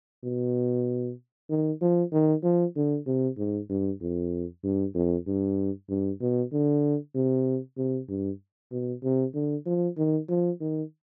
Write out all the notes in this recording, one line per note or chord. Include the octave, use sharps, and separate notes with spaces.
B2
D#3
F3
D#3
F3
D3
C3
G#2
G2
F2
G2
F2
G2
G2
B2
D3
C3
C3
G2
B2
C3
D3
F3
D#3
F3
D#3